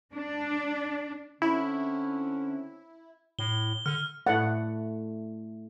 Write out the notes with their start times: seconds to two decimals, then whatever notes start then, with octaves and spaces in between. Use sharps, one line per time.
0.13 D4
1.42 D3 C4 C#4 E4
3.39 A2 G7
3.86 D3 F6
4.27 A2 A3 D5 F#5